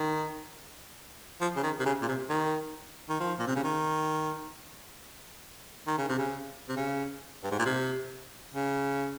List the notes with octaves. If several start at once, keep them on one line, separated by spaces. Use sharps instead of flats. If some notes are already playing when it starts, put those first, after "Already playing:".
Already playing: D#3
F3
C#3
D#3
C3
C#3
A#2
C3
D#3
D#3
F3
A#2
C3
C#3
D#3
D#3
C#3
C3
C#3
C3
C#3
G2
G#2
A#2
C3
C#3